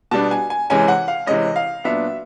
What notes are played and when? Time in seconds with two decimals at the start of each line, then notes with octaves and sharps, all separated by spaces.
0.11 B2 G3 B3 D4 A5
0.31 G#5
0.50 G#5
0.70 C3 E3 G#3 C#4 G#5
0.88 F#5
1.08 F5
1.27 C3 E3 G#3 C#4 D#5
1.56 F5
1.84 A#2 F#3 B3 D4 E5